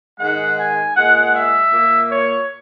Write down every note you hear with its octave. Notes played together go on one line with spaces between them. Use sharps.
G#2 D#3 G#3 F#5
G#5
A#2 G#3 F#5
E5
A#2 A#3
C#5